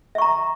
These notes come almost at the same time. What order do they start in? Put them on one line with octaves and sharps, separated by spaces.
E5 C#6 A#5